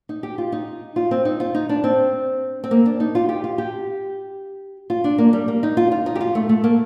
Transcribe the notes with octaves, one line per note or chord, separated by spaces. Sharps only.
D#4
G4
F4
D#4
F4
C4
D#4
F4
D#4
D4
C4
C4
A#3
D4
D#4
F4
G4
F4
G4
F4
D4
A#3
G3
A#3
D#4
F4
F4
D#4
G4
F4
A3
A3
A#3